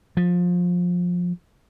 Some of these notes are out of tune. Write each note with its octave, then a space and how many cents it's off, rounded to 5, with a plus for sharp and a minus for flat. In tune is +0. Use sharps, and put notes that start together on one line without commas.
F3 +20